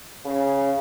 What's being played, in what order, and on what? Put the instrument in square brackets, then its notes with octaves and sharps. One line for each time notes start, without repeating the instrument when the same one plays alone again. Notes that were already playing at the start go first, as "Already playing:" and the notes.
[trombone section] C#3